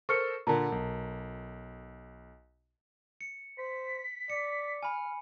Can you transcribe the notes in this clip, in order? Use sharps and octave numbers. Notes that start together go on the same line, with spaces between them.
A4 A#4 C5 C#6 F6 C#7
A#2 D3 A#4 A5 A#5
B1
C#7
C5 B6
D5 C#7
G#5 B5 F6